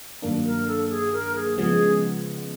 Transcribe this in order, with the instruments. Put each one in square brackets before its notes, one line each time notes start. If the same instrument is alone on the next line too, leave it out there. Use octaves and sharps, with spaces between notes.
[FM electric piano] G2 D#3 F#3 A#3 D4
[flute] A#4
A4
G#4
A#4
G#4
[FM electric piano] C#3 F3 G#3 B3 [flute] G#4